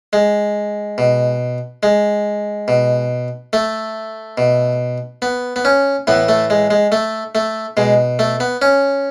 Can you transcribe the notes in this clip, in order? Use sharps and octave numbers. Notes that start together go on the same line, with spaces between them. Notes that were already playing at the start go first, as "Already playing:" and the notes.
G#3
B2
G#3
B2
A3
B2
B3
B3
C#4
A2 E3 B3
A3
G#3
G#3
A3
A3
B2 G#3
A3
B3
C#4